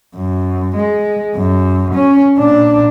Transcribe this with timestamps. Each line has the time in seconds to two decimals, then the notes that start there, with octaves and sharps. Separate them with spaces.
0.17 F#2
0.76 G#3
1.36 F#2
1.94 C#4
2.38 A#2 D4